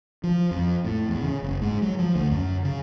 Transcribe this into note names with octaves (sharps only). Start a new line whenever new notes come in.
F3
F2
A2
E2
C#3
F#1
G#2
F#3
F3
D2
F#2
C#3